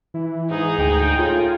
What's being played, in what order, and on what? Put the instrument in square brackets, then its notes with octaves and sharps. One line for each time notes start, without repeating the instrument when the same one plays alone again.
[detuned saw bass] E3 [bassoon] E4
[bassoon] G#2 [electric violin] D#4 G#4 [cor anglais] D#5
[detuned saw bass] D2 [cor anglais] G5
[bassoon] A2 [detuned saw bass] F4